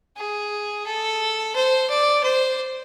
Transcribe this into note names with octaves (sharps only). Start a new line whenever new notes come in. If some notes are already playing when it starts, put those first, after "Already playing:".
G#4
A4
C5
D5
C5